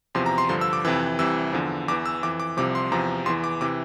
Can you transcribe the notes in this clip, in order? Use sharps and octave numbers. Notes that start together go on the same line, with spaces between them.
E2 C3 F3 C6
A#5
C6
G2 D3 F3 C6
E6
D6
F2 C3 E3 E6
C2 C3 E3 E6
E2 D3 F3
E2 E3 D6
E6
F2 E3 D6
D6
C2 C3 F3 D6
C6
E2 C3 F3 A#5
E2 E3 C6
D6
C3 E3 D6